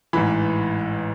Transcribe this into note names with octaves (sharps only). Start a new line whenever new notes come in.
A1 G#2 E3 B5